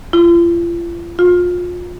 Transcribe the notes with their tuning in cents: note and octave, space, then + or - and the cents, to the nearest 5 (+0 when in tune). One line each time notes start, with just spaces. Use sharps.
F4 -40
F4 +30